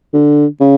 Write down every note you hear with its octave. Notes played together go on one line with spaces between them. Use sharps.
D3
C#3